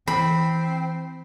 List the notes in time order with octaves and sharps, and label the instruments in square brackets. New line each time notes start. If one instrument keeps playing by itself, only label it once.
[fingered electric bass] E3 [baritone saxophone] C4 [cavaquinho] B5